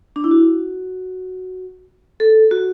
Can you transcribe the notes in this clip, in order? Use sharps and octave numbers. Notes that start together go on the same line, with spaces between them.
D4
E4
F#4
A4
F#4